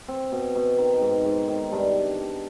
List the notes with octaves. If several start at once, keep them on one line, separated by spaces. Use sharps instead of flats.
C4
B2
B2
D#3
G#2
G#2
D#3
G2 D4